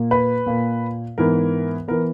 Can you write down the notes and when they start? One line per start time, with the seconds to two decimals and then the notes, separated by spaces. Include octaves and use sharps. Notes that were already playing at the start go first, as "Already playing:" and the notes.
Already playing: A#2 A#3
0.11 B4
0.46 A#2 A#3
1.18 G#2 E3 B3 A#4
1.88 E3 B3 A#4